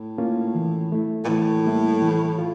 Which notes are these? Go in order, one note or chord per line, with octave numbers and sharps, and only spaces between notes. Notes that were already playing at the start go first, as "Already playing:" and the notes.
Already playing: A2
A#3 C#4 F4
E3
A3 E4
A#2
A2 E3
G3 A#3 E4
E3
F4